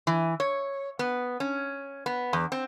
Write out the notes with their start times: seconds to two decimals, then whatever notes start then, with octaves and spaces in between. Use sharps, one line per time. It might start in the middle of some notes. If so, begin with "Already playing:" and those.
0.07 E3
0.40 C#5
0.99 B3
1.40 C#4
2.06 B3
2.33 E2
2.52 C4